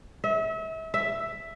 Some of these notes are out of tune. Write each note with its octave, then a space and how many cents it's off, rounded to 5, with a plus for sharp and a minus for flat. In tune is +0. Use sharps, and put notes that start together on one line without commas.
E5 -35
E5 +5